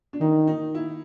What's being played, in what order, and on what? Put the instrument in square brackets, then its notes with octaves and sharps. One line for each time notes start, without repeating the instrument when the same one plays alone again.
[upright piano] D4
[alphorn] D#3 [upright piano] D#4
[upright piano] D#4
E4